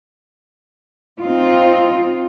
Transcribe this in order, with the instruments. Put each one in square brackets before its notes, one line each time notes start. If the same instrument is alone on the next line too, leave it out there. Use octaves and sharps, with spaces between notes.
[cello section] C4 D#4 F4